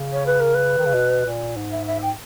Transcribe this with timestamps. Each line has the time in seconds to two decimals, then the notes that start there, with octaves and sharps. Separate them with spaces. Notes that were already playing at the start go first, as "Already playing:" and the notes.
Already playing: C#3
0.12 C#5
0.26 B4
0.40 A#4
0.54 B4
0.78 D#3
0.86 C#3
0.94 B2
1.26 A#2
1.56 G#2
1.71 E5
1.87 E5
2.02 G5